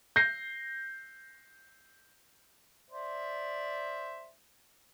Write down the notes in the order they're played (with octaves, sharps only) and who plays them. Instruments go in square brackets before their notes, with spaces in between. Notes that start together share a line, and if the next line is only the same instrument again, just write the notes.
[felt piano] G6 A#6 C7
[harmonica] C5 D5 E5